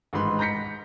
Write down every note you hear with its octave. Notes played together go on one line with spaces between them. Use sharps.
A1 G#2 D#3 B4 B5 C6
A#5 G6 A#6 B6 C#7